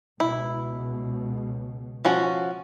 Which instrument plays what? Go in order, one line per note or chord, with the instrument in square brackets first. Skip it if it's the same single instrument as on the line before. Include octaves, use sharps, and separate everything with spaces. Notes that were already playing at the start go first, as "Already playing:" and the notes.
[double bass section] C#2 B2 [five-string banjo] E4
[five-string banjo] F3 C#4 F#4